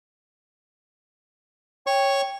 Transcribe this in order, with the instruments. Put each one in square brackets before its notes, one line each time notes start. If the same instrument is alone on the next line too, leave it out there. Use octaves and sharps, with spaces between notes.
[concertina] C#5 C#6 [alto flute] G5